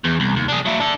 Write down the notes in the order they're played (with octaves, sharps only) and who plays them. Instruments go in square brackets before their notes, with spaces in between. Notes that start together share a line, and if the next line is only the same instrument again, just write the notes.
[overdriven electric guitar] E2
C2
D#2
D4 G#4
F#3 E4
D4 A4